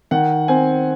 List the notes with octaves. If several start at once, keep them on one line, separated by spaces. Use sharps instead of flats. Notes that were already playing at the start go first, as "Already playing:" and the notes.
D#3 F#5
C4 G#5